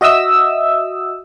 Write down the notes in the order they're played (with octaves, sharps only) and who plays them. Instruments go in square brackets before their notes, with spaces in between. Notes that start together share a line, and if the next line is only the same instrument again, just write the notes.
[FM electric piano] F#4 D#5 E5 D#6 E6